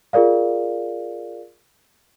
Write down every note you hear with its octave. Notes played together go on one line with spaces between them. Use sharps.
F4 G#4 A#4 D5 F5